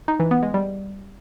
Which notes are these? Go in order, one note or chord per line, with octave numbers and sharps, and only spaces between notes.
D#4
E3
B3
G#3
G3